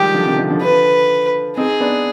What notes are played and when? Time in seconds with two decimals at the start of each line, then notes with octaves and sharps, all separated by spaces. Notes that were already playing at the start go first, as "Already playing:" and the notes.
Already playing: D#3 F3 G3 G#3 G4
0.14 D3 F3
0.25 C3 D#3
0.38 D3 F3
0.50 D3 F3
0.61 D3 F3 B4
1.57 C4 D#4 G#4
1.80 B3 D4